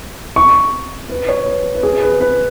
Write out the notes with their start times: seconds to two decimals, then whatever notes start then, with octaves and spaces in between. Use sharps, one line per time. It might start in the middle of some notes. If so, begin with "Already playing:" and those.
0.36 C#6
1.10 B4
1.29 C#5
1.46 B4
1.75 B4
1.83 G#4
2.02 B4
2.21 B4